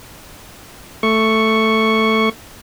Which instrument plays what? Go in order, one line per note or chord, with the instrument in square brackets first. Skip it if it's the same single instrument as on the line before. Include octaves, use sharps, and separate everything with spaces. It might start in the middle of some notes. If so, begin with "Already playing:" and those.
[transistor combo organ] A3 C#6